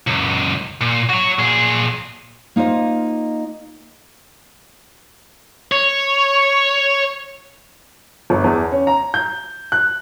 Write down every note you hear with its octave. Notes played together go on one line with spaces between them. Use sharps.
C#2 F#2
A#2
F#4 C#5
A#2 G#4
A#3 D#4 F4 C5 D#5
C#5
G1
E2
C#4
A#5
G6
F#6